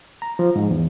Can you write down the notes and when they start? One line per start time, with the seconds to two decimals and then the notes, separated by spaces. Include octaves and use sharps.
0.22 A#5
0.39 F3
0.56 G#2
0.71 E2